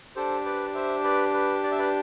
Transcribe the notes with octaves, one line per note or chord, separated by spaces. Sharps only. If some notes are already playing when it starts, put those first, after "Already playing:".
D4 G4 A4 C5
B4 D5
C5 E5
B4 D5
B4
D5
E5
B4 D5